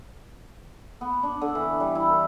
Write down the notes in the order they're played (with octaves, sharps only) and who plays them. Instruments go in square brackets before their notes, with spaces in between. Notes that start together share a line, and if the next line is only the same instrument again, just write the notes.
[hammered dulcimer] B3
D4
D3
E3
G3
E4
A#4